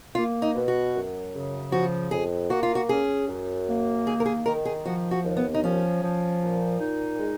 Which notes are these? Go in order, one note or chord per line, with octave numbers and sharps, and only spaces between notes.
A#3 F4
D#4
B2
F#4
F#2
C#3
F3 F#4
F2 G#4
A#3 F#4
F4
F#4
C#4 G#4
F#2
A#3
D#3 G#4
A#4
G#4
D#3 A#4
G#4
F3 F#4
F#4
D#2
B3
D#4
F3 C#4
F3
A#2
D#4
G#3